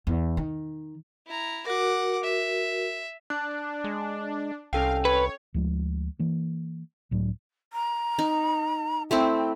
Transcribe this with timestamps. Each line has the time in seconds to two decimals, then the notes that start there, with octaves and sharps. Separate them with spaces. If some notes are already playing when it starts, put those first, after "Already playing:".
0.07 E2
0.37 D#3
1.26 E4 A#5
1.66 F#4 A#4 F#5 D6
2.23 E5
3.30 D4 F#6
3.84 G#3
4.73 C2 C#4 A4 F5 G5
5.05 B4 C#5
5.54 D2 F3 G#3
6.19 E3 A#3
7.11 C#2 A2 F#3 D4
7.73 A#5
8.19 D#4
9.11 A3 C4 E4 G5